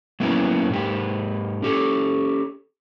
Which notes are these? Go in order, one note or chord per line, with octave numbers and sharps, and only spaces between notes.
F#3 A#3 B3 C#4 E4
G#2 A#3 G4
C#4 G4 A4